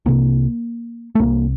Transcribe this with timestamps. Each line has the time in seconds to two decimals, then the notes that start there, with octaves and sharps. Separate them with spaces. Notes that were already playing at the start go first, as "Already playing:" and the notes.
0.06 C2 C3 A#3
1.15 A3
1.19 C2 C3 A#3